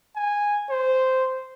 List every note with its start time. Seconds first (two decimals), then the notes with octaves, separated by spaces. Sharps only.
0.16 G#5
0.70 C5